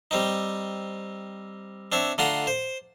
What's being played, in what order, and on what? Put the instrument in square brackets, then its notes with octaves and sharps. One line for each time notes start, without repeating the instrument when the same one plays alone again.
[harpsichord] G3 C4 D#4
C4 D4 C#5 E5
D3 A3 F4 F#5 A#5 C6
C5